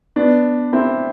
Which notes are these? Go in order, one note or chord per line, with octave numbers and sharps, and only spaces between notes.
B3 D4
C4 E4